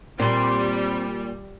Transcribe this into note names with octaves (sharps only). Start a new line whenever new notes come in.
A#2 G3 C4 C6